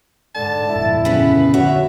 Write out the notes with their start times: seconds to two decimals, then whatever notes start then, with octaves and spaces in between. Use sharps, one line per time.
0.35 G#2 D3 A5
0.69 G1 F2 A#2 E4
1.05 C#3 B3 B4
1.54 D3 F#4 C#5 E5